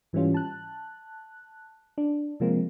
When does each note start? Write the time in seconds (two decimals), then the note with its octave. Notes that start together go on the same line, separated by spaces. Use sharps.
0.13 G#2 E3 G3 C#4 F4
0.34 A5 F#6
1.98 D4
2.40 C3 F3 G#3 A#3 C4